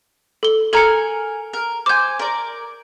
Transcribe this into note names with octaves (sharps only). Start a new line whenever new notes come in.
A4 G7
A4 A#4 G#5 A#5 C#7
A#4
C5 G#5 D6 G6
A#4 D5